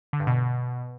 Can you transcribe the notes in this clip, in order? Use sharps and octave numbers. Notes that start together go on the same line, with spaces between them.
D3
G2
B2